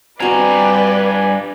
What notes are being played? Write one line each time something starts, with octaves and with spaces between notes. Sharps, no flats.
G2 C4 F#4 B4 D5 G#5 A#5